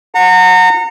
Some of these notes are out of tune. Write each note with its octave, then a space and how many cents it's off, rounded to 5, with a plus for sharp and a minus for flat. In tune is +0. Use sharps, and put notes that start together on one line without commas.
F#5 -20 A#5 -30